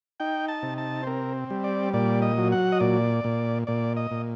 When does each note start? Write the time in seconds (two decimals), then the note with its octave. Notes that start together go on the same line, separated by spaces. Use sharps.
0.20 D#4 G5
0.48 A5
0.63 C3
0.78 A5
1.03 C5
1.07 C4 A#4
1.50 G3
1.64 D5
1.93 A#2 D5
2.22 D#5
2.37 F#3
2.52 F#5
2.72 D#5
2.80 A#2 D5
3.24 A#2
3.67 A#2 D5
3.96 D#5
4.11 A#2